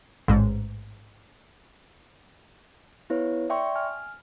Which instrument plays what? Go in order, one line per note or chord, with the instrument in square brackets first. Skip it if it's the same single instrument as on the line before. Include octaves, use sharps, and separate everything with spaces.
[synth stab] A1 G#2
[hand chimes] B3 E4 B4 C#5
D5 E5 G5 C6 C#6
G#5 F6